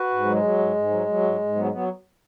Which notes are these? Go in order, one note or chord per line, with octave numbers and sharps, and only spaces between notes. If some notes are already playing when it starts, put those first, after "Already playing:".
Already playing: F#4 B4
G#2
F#3 G#3
F#3
G#2
G#2
F#3
F#3
G#2
G#2
F#3 B3
G#3
F#3 B3